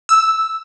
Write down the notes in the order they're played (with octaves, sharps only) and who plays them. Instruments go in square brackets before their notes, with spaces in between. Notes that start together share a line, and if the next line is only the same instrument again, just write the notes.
[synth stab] E6